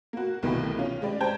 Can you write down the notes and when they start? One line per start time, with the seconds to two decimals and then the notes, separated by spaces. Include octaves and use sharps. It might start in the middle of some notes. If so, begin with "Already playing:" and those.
0.13 A#3 F#4
0.43 C2 B2 D#3 E3 A3 A#3
0.77 C#4 F4
1.02 G#3 G4 D5
1.21 C5 G5 A5 A#5 G6 G#6